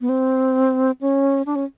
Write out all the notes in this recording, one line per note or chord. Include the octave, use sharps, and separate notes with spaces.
B3
C4
C#4
D4
C#4